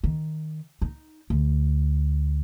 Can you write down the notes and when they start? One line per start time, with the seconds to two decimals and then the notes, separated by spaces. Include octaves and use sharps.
0.04 D#3
0.82 D#4
1.30 D2